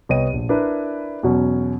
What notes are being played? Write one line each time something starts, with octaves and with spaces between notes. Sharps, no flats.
C2 B3 C#5 D#5 G5 D#7
A#1
D4 E4 A#4 B4
E2 B2 F#3 C#4